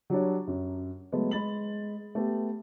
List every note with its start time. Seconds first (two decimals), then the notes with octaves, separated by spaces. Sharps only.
0.10 F#3 G3 D4 C#5
0.47 F#2
1.12 F#3 G#3 A3 B3
1.31 G#3 B5 A6 F#7
2.15 A3 B3 G4